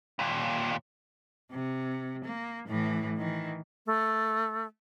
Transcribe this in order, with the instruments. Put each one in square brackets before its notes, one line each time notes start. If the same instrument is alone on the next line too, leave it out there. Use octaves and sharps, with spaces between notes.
[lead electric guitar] D#2 A#2
[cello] C3
A#3
A2 E3
D#3 E3
[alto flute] A3